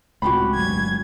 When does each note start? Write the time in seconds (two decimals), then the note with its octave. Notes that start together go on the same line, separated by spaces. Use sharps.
0.22 C#2 A2 C3 G#3 F#4 G4 B5
0.55 G1 D2 F#3 G#6